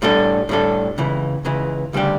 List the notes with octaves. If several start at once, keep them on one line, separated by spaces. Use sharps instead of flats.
A2 G3 D4 A4
A2 G3 D4 A4
C#2 C#3 E3
C#2 C#3 E3
D2 C#3 G3 D4 G4